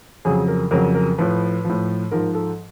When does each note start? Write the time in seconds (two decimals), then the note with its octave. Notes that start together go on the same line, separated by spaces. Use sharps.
0.25 F2 C#3 F#3 G#4
0.48 A#4
0.71 F2 C#3 F#3 A#4
0.95 A#4
1.18 A2 F3 B4
1.65 A2 F3
2.11 G#2 F3 A#4
2.35 A4